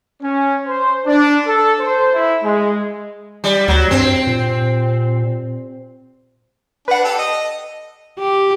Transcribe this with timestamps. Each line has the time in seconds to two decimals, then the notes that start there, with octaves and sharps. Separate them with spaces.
0.22 C#4
0.67 C5
1.05 D4
1.46 A4
1.80 C5
2.13 E4
2.43 G#3
3.44 G3
3.68 D2 F#3
3.91 G2 C4
4.27 A#2
6.88 D4 B4 F#5
7.04 G4 A4
7.18 D#5
8.19 G4